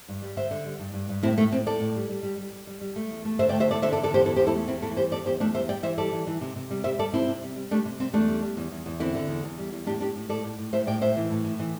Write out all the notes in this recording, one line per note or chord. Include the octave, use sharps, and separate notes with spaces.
G2
G3
D3 C5 E5
D3
G3
G2
G2
G2
A2 C4 E4
A2 A3
A2 C4
A2 A4 D5
A2
G3
G3
G3
G3
G3
G3
G3
A3
E2
A3
D3 C5 E5
D5 G5
A3
C5 E5
E2 A4 D5
D3 C5 E5
A4 D5
D3
A4 D5
E2 G4 C5
E2 E4 A4
G4 C5
E2
E4 A4
A3
E2 C4 E4
E3 E4 A4
G3 G4 C5
E2 A4 D5
E2 G4 C5
E2 A3 D4
G3 C5 E5
G3 D5 G5
E3 C5 E5
G3 A4 D5
E3
E3
C3
C3
G3
G3 C5 E5
G3 A4 D5
C3 C4 E4
C3
G3
G3
G3 A3 D4
C3
G3 C4
E2 A3 D4
G3
G3
E2
E2
E2
D3 C4 E4
D3
E2
E2
G3
E2
A2 D4 G4
A2 D4 G4
A2
A2 A4 D5
A2
A2
A2 C5 E5
A2 D5 G5
A2 C5 E5
E3
A2
A2
E3